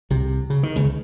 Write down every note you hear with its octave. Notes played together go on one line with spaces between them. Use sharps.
C2 C3
C#3
D#3
C#2 C#3